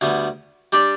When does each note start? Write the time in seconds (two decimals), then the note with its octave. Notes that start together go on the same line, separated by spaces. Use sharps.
0.01 D2 D3 G3 B3
0.72 G3 D4 G4 D5